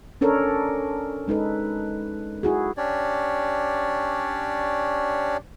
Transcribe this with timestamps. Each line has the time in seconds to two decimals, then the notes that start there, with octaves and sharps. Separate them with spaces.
0.21 C#4 D4 A4 A#4 C#5
1.28 G#3 D#4 A4 B4
2.43 E4 F#4 G#4
2.77 C#4 D4 G4 C#5 D5